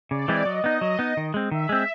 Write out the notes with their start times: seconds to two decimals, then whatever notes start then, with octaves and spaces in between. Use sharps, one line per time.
0.10 C#3 D5
0.28 E3 G#3 C4 E4
0.45 F#3 D#5
0.64 B3 D#4
0.81 F#3
0.99 B3 D#4
1.17 D#3
1.34 G#3 C4
1.51 D#3 E5
1.69 G#3 C4